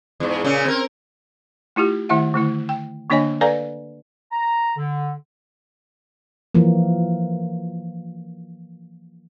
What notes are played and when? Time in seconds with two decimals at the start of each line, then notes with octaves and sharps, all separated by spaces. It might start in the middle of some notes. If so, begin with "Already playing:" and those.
0.20 E2 G#2
0.44 A#2 C#3 C#4
0.66 C4 A#4
1.76 A3 E4 F4 G4
2.09 D#3 A3 E4 E5 F#5
2.34 D3 A3 E4
2.69 G5
3.10 D3 A#3 D4 C#5 D#5 G#5
3.41 A4 B4 D5 F5 G#5 A#5
4.31 A#5
4.77 D3
6.55 E3 F3 A#3